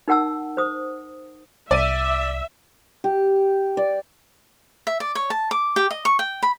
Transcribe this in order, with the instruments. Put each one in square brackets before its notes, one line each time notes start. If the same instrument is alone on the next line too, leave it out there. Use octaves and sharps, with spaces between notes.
[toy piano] D#4 A#4 F#5 A5 E6
C5 D#6
[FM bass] C2 [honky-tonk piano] D5 D#7 [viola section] E5
[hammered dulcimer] G4
D5
[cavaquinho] E5
D5
C#5
A5
D6
G4
D#5
C#6
G5
B5